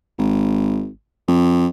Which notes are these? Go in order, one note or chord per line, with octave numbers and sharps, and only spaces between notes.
G#1
F2